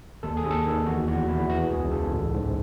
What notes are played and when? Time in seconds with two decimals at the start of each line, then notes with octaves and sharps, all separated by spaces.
0.23 D#2 A4
0.37 G#4
0.44 D#2
0.51 A4
0.66 D#3
0.86 E2 F#4
1.07 E2 F#4
1.29 E2 E4
1.50 E3 F#4
1.71 C#2 G#4
1.92 C#3 A4
2.13 A1
2.34 G#2